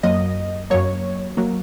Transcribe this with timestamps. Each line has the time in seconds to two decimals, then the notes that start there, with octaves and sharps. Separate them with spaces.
0.03 F#2 F#3 A#3 D#5
0.70 F#2 F#3 A#3 C#5
1.37 F#3 A#3